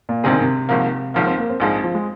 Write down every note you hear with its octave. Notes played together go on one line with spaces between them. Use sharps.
A#2
A#1 G#2 C3 G#3 C4 G#4
D#3
C3
G#1 G#2 F3 A#3
G#1 G#2 F3 A#3
C4
A#3
C4
A#1 G#2 F3 G#3
F3
G#3